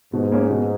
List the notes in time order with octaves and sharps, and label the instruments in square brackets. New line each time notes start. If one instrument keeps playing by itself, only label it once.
[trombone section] G#2 [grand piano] B2
[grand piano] A#3 C#4
B2